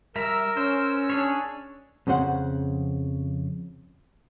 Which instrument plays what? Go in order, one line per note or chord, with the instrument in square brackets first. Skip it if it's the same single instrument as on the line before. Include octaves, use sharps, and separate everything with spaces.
[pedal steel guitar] G3 E5 A#5 [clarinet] A#4 [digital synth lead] E6
[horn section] C#4 [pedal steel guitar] C5 [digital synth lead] E6
[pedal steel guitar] D4 G#4 C#5
[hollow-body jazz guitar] F2 C#3 C#4 C5 F#5